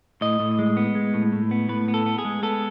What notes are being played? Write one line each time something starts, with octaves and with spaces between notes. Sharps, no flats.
A2 D#5
A2
G#3
B3
G#3
A2
A2
B3
A2 B4
B3
A4
B3
G#4
G#3
B3 A4